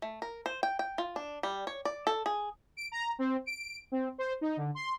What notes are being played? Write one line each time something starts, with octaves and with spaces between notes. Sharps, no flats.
A3
A#4
C5
G5
G5
F4
D4
G3
C#5
D5
A4
G#4
D7
A#5
C4
D7
C4
C5
D#4
D3
C6